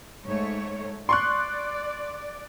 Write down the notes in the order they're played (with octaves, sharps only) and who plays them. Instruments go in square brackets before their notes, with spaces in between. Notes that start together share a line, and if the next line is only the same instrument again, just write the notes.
[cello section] G#2 A3 C#5
[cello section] D5 [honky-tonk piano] C6 C#6 F#6